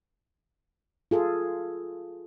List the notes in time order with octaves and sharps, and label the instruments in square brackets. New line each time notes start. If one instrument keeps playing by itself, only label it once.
[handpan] F4 G#4 A4